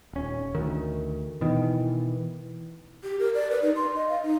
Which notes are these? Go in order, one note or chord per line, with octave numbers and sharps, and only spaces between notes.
D#1 C#4
D2 D#3
B2 D#3 E3
G4
A#4
D5
B4
D#4
C6
D#5
F5
D#4